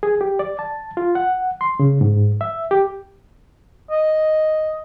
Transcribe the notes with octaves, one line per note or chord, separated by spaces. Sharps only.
G#4
G4
D5
A5
F4
F#5
C6
C#3
G#2
E5
G4
D#5